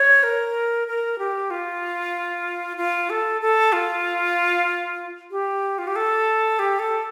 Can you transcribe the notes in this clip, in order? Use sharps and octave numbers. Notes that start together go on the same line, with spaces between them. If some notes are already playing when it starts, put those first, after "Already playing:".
Already playing: C#5
A#4
A#4
G4
F4
F4
A4
A4
F4
G4
F4
G4
A4
G4
A4